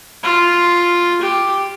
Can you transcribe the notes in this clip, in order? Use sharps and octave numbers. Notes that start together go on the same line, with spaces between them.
F4
G4